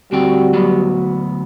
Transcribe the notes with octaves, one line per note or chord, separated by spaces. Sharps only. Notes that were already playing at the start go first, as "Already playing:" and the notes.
D2 G3 C4 F#4 G5
D2 F#3 B3